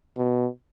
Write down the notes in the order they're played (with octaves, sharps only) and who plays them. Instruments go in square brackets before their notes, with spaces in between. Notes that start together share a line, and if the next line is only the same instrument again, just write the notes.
[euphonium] B2